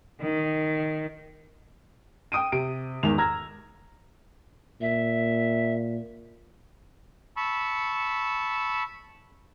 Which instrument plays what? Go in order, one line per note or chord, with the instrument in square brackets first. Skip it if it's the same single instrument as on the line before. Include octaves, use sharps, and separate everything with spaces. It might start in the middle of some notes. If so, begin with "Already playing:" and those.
[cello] D#3
[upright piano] G5 D#6 D7 D#7
C3 D7
E2 G#2 D#3 F7
A#5 E6 F6 G#6 A#6
[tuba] A#2 [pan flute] E5
[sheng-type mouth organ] A5 B5 C#6 E6